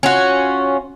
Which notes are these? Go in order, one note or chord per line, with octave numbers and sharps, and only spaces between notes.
C#4 F4 F#4